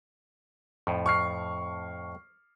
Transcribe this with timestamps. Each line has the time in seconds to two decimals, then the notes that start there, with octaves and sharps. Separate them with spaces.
0.87 F2 A2
1.06 C#6 F6 C7